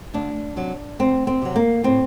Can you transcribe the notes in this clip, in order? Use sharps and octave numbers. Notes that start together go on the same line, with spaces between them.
D2 D4
C3 F#3
D2 C4
C4
C3 F#3
A#3
A2 C4